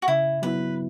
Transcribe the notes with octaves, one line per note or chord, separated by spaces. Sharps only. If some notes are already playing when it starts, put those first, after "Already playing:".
F#4
C#3 E4
F#3 B3 E4 B4